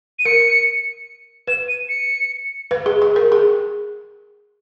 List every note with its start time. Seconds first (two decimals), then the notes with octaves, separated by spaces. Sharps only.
0.19 D#7
0.25 A#4 C#7
1.47 B4 E7
1.68 D#7
1.89 C#7
2.71 B4
2.86 G#4
3.02 G#4
3.16 A#4
3.32 G#4